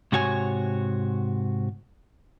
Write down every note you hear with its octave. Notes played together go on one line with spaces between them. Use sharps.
G#2 C3 F#4 C#5 G#5